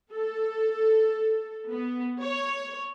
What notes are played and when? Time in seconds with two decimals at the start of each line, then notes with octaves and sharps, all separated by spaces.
0.13 A4
1.71 B3
2.23 C#5